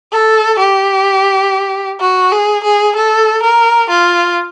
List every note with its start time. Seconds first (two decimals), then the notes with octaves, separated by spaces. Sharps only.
0.12 A4
0.59 G4
2.00 F#4
2.32 G#4
2.64 G#4
2.96 A4
3.43 A#4
3.90 F4